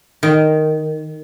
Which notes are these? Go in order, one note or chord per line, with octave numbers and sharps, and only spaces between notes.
D#3